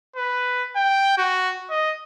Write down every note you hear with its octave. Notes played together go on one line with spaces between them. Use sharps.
B4
G5
F#4
D#5